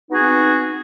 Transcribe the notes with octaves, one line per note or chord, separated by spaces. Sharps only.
B3 C4 D#4 F#4 G#4